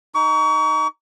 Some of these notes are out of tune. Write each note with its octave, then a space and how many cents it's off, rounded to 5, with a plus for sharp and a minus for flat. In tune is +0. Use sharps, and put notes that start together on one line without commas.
D#4 +0 C#6 +35